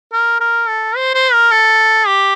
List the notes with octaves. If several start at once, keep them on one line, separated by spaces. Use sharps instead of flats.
A#4
A#4
A4
C5
C5
A#4
A4
G4